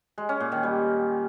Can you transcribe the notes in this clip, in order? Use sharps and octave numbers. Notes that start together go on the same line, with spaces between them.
G#3
C#4
A#2
D#3
G3